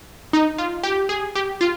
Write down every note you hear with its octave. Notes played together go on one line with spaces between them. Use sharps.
D#4
F4
G4
G#4
G4
F4